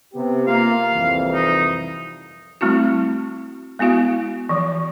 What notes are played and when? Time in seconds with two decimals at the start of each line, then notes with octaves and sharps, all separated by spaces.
0.14 C3 B3 G4
0.47 A#3 F4 F5
0.93 C2 F2 E3
1.34 D#4
2.61 G3 A3 C4 E4 F#4
3.79 G#3 B3 E4 F#4 F5
4.49 E3 F3